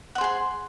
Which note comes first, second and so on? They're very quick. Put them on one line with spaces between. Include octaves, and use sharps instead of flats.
F#5 C5 G#4 C6